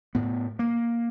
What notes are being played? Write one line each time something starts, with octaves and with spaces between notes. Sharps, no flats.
A2 B3
A#3